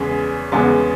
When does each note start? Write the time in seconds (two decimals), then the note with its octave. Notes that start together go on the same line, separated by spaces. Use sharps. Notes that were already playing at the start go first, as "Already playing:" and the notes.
Already playing: E2 C#3 G#3 B3
0.52 E2 C#3 G#3 B3